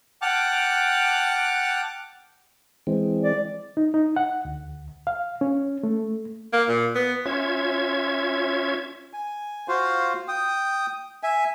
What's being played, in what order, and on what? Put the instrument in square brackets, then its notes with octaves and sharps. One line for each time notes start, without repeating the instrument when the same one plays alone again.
[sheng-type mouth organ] F#5 G5 A5 D6 F6 F#6
[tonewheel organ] E3 G#3 C4
[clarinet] D5
[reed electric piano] D#4
D#4
F#5
D2
F5
C#4
A3
[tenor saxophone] A#3
A#2
B3
[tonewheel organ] C#4 F4 C#5 E5 G#6
[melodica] G#5
F4 F#4 C5 F5
G5 D#6
E5 G#5